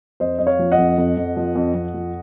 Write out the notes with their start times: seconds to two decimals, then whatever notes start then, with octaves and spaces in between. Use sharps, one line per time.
0.20 F2 C5 D#5
0.39 F2 D#5
0.47 C#5 F5
0.59 F3
0.72 D#5 F#5
0.78 F2
0.98 F2
1.17 F2
1.37 F3
1.56 F2
1.75 F2
1.94 F3